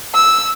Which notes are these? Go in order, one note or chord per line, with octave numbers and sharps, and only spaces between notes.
E6